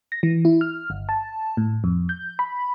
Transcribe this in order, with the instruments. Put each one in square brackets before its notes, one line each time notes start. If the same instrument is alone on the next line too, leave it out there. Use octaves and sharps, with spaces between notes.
[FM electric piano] A#6
E3
E4
F6
G1
A5
A2
F2
G6
B5